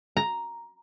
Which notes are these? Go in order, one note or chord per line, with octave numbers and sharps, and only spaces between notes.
A#5